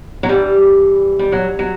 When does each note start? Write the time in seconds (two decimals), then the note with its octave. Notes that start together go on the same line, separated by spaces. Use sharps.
0.23 F#3
0.28 G2 E3 G3
1.19 G3
1.32 F#3
1.59 F#3